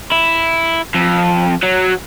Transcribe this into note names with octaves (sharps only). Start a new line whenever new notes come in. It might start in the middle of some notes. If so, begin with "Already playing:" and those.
E4
F2
F#3